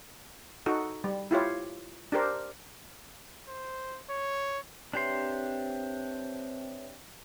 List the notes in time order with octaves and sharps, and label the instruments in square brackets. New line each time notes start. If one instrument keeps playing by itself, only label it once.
[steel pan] D#4 F#4 A4
G3
E4 F4 G4 C#5
D4 G4 A#4 C5
[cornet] C5
C#5
[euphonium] C4 [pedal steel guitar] D4 G4 C6 [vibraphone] B4 C#5 E5